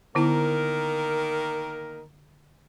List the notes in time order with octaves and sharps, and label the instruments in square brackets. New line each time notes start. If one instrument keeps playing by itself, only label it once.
[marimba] D3 B3 E4 [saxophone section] D#3 A#3 A#4